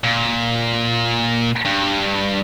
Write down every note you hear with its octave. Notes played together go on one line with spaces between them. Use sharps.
A#2
G2